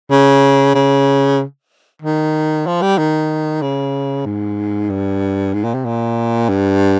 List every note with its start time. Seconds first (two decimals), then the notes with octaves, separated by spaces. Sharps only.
0.11 C#3
0.75 C#3
2.02 D#3
2.67 F3
2.82 G3
2.98 D#3
3.62 C#3
4.25 G#2
4.90 G2
5.54 G#2
5.64 A#2
5.74 C3
5.85 A#2
6.49 G2